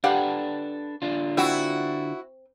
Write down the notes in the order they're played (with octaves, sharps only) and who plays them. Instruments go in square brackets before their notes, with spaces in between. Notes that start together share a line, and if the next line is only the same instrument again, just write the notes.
[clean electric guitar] D4 A4 B4 [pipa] G4 F5 F#5
[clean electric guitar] D3 D4 F4
[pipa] C4 [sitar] E4 F#4